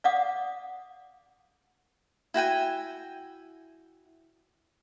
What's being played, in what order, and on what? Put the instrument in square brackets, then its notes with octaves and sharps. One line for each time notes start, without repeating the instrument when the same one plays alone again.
[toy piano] D5 F5 F#5 D6 D#6
[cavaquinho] E4 F#4 G5 G#5